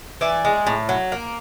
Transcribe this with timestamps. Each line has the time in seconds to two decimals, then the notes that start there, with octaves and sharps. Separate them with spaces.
0.21 E3 D5 E5
0.45 G#3
0.67 A2
0.89 F#3
1.12 A#3